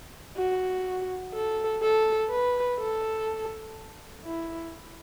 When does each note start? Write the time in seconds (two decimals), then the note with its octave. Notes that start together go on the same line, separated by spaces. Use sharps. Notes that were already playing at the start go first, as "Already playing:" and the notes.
0.37 F#4
1.34 A4
1.82 A4
2.31 B4
2.80 A4
4.25 E4